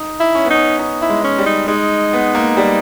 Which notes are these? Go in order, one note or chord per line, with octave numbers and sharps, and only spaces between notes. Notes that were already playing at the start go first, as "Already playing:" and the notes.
Already playing: D#4
E4
C#4
B3
C#4 D#4
D#4
E4
G#3
C#4
G3
D#4
G#3 D#4
B3
A#3
G3